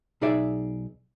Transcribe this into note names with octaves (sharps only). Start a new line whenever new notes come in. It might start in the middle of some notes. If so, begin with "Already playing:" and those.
B1 D#4 G#4 D5 E5